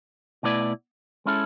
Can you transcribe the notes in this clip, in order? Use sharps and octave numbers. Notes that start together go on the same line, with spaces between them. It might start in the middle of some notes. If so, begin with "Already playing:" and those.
B2 A3 E4 B4 D5
G#3 C#4 E4 A4